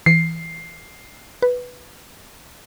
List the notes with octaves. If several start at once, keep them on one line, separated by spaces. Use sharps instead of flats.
E3 C7 C#7
B4